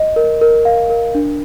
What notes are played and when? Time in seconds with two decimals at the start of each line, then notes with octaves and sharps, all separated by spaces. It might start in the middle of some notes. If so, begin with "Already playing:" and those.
Already playing: D#5
0.16 A#4
0.41 A#4
0.65 F5
0.90 A#4
1.15 D4